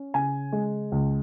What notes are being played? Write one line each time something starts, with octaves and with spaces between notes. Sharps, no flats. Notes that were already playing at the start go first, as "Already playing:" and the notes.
Already playing: C#4
C#3 G#5
G#3
C#2